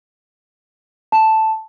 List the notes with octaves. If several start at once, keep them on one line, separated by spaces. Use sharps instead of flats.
A5